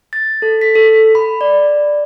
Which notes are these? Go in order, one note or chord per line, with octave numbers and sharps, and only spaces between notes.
A6
A4
B6
A4
B5
D5